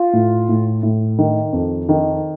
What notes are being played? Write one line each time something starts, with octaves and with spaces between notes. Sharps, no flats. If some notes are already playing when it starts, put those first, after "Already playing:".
Already playing: F4
A2
A2
A2
D#3
F2
D#3